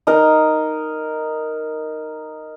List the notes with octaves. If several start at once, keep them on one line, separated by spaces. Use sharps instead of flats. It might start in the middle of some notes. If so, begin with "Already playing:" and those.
D#4 A#4